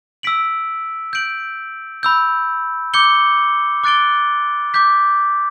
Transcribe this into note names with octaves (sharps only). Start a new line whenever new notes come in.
E6 B6 D7 F#7
G6 D7 F#7
B5 E6 G6
D6 G6 C#7 G7
D6 F#6 A6 D7 G7
D6 G6 B6